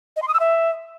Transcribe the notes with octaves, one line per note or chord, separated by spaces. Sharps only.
D#5
C6
D#6
E6
E5